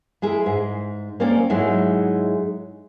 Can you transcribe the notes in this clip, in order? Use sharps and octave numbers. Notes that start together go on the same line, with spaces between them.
G#3 E4 G#4 A#4
G#2
A#3 C4 C#4 D5 G5
G#2 F#3 G#3 D#4 E4 E5